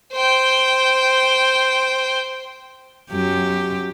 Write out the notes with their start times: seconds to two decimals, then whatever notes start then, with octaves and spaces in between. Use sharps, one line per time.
0.13 C5 G5
3.11 F#2 G4